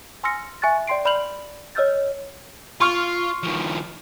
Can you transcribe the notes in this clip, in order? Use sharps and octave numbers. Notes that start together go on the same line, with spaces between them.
G#5 C6 E6 F6 A#6 C#7
E5 G#5 C#6 F#6 A6
D5 G5 C6 C7 D7
D5 B5 F6 G6 F7 F#7
C#5 D#5 E6 F6 G6 A6
F4 C6 C#6 F6
D#3 F3